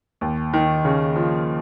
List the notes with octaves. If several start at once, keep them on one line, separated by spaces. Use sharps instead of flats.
D#2
D#3
C#3
F3